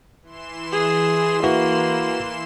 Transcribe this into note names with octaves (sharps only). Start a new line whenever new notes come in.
E3 C6 E7
G#4
A#3 E4 F#4 B4